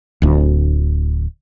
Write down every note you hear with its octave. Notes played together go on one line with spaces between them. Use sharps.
D1 D2